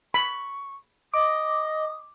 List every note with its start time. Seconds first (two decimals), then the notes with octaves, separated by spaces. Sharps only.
0.14 B5 C#6
1.14 D#5 D6 D#6